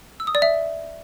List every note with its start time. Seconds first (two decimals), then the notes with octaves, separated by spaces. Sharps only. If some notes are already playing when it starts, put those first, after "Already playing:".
0.20 E6
0.27 D#6
0.35 D5
0.42 E5